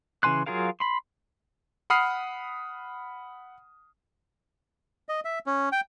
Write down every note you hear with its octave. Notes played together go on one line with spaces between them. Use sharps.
C#3 E3 G#5 C6 F#6
F#3 F4 G#4 A#4 F5
B5 C6
F#5 B5 D#6 F6 C7
D#5
E5
C#4
G5